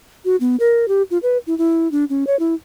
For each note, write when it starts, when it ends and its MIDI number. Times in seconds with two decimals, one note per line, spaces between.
0.25 0.36 66
0.40 0.56 59
0.60 0.88 70
0.88 1.02 67
1.11 1.18 65
1.23 1.38 71
1.47 1.56 64
1.58 1.90 64
1.92 2.05 62
2.10 2.24 61
2.27 2.38 73
2.39 2.54 64